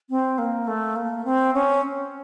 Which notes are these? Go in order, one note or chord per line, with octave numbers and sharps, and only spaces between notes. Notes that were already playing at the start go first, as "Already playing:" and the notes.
C4
A#3
A3
A#3
C4
C#4